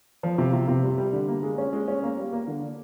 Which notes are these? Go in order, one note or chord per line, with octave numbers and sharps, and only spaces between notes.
F3
C3
C3
C3
G3
G3
D3
A#3
G#3
C#4
G#3
C#4
A#3
G3
A#3
D3